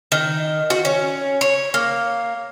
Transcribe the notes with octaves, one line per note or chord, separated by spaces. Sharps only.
D#3
F#4
C#4
C#5
A#3